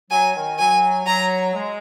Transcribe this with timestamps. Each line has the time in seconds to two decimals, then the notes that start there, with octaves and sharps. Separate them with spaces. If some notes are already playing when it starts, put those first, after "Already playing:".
0.11 F#3 G#5
0.35 D#3
0.59 F#3 G#5
1.06 F#3 A#5
1.54 G#3